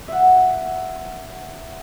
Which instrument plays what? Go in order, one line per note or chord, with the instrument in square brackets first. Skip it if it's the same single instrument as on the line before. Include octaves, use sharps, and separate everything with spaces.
[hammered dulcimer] E5 F#5